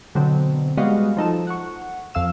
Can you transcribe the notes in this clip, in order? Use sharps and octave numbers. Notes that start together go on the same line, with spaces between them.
B2 D3 F#3 C4
G3 G#3 B3 F#4 D#5 F5
F3 D#4 A4 E7
F#5 C#6
F2 F5 E6 E7